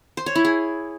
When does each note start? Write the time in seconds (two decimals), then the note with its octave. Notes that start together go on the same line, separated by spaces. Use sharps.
0.17 C5
0.26 C#5
0.35 E4
0.45 G#4